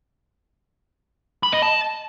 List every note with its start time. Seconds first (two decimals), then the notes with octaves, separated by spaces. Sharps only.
1.43 B5
1.53 D#5
1.62 A5